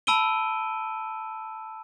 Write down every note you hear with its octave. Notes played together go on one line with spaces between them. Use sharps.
A5 B5 E6 D7 D#7 G7